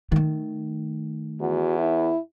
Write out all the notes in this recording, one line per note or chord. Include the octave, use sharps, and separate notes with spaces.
D#3 A3
E2 F#4
E4